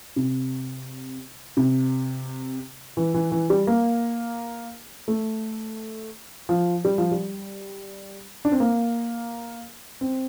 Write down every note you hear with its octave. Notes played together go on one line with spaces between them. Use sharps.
C3
C3
E3
E3
E3
G3
A#3
A3
F3
G3
F3
G3
D4
C4
A#3
C4